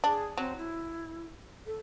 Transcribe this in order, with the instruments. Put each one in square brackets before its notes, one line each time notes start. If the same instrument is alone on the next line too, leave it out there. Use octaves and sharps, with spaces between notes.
[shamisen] D4 [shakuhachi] G#4
[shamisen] F#3 [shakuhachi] C4
[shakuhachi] E4
A4